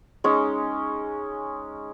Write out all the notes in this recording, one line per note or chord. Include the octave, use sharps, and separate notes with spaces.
G#3 C#4 D#4